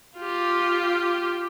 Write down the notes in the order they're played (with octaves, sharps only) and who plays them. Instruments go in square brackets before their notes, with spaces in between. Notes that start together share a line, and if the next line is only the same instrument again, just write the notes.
[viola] F4 G4